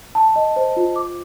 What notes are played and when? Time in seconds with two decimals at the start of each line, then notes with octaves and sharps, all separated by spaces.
0.15 A5
0.36 D#5
0.56 C5
0.77 F4
0.96 D6